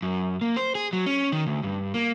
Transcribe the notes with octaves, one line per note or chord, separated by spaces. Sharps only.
F#2
A#3
C5
G#4
F#3
C#4
D#3
D2
G2
A#3